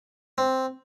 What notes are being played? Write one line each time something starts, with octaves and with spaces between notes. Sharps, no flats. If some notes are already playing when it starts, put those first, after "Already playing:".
C4